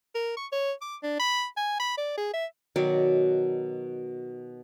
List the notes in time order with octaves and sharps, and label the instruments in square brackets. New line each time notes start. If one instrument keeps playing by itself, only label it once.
[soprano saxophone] A#4
C#6
C#5
D6
D4
B5
G#5
B5
D5
G#4
E5
[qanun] B2 D#3 F#3 D5